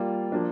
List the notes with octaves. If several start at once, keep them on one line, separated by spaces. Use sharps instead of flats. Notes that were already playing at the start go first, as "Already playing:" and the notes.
Already playing: G3 A#3 F4 D5
F3 A#3 D4